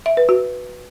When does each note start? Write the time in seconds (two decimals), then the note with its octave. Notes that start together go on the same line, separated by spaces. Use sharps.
0.06 E5
0.17 B4
0.29 F#4